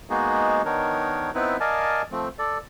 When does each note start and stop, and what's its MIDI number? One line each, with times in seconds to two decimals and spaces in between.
0.10 0.62 56
0.10 0.62 58
0.10 0.62 59
0.10 0.62 63
0.10 0.62 66
0.10 0.62 68
0.65 1.30 51
0.65 1.30 59
0.65 1.30 62
0.65 1.30 63
0.65 1.30 70
0.65 1.30 73
1.35 1.57 59
1.35 1.57 60
1.35 1.57 63
1.35 1.57 64
1.35 1.57 71
1.60 2.02 70
1.60 2.02 74
1.60 2.02 75
1.60 2.02 77
1.60 2.02 80
1.60 2.02 81
2.12 2.28 53
2.12 2.28 57
2.12 2.28 60
2.39 2.58 69
2.39 2.58 74